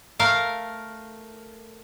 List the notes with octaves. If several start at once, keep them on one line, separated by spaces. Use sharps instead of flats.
A3 A#4 F5